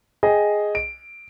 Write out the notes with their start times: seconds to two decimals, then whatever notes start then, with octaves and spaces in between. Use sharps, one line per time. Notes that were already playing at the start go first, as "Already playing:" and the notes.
0.23 G#4 D#5 G5 G#5
0.75 D7